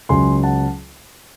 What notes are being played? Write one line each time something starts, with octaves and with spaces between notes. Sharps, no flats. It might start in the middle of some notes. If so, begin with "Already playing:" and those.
C#2 C#3 F#3 G#5 C6
F#5 A5